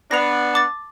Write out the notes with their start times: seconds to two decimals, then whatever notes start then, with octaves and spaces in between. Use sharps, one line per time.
0.11 B3 D4 A#6 F7
0.54 A5 D6 A6